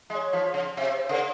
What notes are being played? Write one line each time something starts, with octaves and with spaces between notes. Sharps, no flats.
G#3 E5
C#5
F3
C#3
C3 E5
C5
C#3 A#4